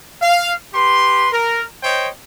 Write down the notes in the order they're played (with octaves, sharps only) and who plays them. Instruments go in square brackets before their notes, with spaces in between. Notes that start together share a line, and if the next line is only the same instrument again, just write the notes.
[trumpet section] F5
G4 B4 C6
A#4
C5 C#5 D#5 G5